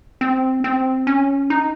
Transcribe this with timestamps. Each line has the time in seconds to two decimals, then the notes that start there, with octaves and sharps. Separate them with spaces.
0.21 C4
0.64 C4
1.07 C#4
1.50 D#4